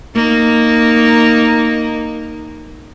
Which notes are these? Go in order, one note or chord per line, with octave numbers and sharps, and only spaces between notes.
A#3 D#4